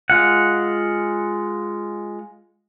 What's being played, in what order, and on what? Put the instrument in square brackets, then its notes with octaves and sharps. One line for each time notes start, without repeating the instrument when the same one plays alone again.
[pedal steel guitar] G#3 F4 F#5